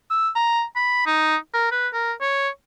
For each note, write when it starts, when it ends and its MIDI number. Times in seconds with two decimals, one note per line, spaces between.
0.10 0.29 88
0.35 0.63 82
0.76 1.03 83
1.06 1.36 63
1.54 1.68 70
1.72 1.88 71
1.94 2.12 70
2.21 2.49 73